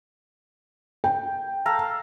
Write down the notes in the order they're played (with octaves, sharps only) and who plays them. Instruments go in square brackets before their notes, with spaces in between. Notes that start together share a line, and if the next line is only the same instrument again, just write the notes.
[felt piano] G5
[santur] A4 F5 A#5